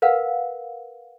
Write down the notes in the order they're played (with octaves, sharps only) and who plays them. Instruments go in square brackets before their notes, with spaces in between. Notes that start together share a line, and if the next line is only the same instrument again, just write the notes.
[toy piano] A#4 B4 F5 F#5